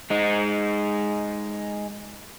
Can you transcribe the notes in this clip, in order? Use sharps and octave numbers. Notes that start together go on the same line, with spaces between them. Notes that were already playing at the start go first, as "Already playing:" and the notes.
G#3 D#4